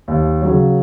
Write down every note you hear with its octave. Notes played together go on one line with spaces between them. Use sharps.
D#2
C#3 F#3